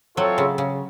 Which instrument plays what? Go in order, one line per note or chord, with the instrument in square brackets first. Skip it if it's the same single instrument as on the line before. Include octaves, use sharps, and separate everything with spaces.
[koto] F#3 [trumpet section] C4 F4 A4 C#5 E5
[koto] C#3
C#3